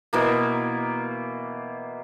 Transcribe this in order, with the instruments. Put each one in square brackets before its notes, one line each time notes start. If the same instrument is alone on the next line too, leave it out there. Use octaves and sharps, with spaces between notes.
[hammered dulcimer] B2 E3 A#3